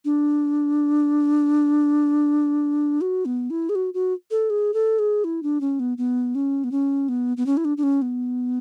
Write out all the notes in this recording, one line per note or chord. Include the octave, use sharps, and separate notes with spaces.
D4
F#4
B3
E4
G#4
F#4
F#4
A4
G#4
A4
G#4
E4
D4
C#4
B3
B3
C#4
B3
C#4
B3
B3
C#4
E4
D4
D4
C#4
B3